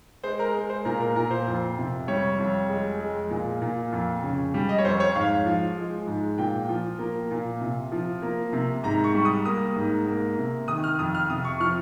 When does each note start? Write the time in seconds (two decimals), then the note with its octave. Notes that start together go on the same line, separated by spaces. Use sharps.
0.23 G#3 C5
0.39 A#4
0.54 G#3
0.70 C5
0.85 A#2 A#4
1.01 A#4
1.16 A#2 A#4
1.31 C5
1.47 F2
1.78 C3
2.08 G3 C#5
2.39 F2
2.69 G#3
3.00 G#3
3.30 A#2
3.62 A#2
3.92 F2
4.23 C#3
4.54 G3
4.69 D#5
4.78 C#5
4.85 F2 C5
5.00 C#5
5.15 G#2 F5
5.46 F3
5.77 G#3
6.07 G#2
6.38 A#2 G5
6.69 F3
6.99 A#3
7.31 A#2
7.60 C3
7.92 F3
8.22 A#3
8.53 C3
8.84 G#2 A#5
9.04 C#6
9.15 G3
9.25 D#6
9.45 A#3 D#6
9.76 G#2
10.07 A#3
10.38 C3
10.68 D#3 D#6
10.84 F6
10.99 F2 D#6
11.15 F6
11.29 C3 D#6
11.45 C#6
11.60 F3 F6